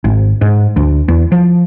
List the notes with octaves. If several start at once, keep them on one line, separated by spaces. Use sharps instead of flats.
G#1
G#2
D2
E2
F3